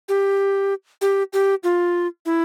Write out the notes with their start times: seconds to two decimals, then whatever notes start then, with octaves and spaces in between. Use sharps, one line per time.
0.09 G4
1.01 G4
1.33 G4
1.64 F4
2.26 E4